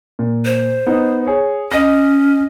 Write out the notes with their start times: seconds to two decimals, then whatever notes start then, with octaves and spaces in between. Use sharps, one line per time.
0.19 A#2
0.45 C5
0.87 B3 D#4
1.27 G#4 C#5
1.72 C#4 D#5 A#6